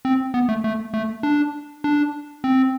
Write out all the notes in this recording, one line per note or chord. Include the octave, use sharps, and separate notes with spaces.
C4
B3
A3
A3
A3
D4
D4
C4